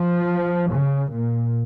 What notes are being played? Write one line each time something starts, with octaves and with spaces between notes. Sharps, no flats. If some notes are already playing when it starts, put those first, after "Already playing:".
Already playing: F3
C#3
A#2